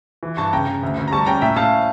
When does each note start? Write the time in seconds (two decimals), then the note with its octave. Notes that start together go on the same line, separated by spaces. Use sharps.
0.23 E3
0.37 G2 A5 C#6
0.53 C#3 G5 A#5
0.67 C#3
0.83 D2
0.98 D2
1.08 A#5
1.11 G3 A5 C#6
1.26 C#4 G5 A#5
1.41 A2 E5 G5
1.56 A2 F5 A5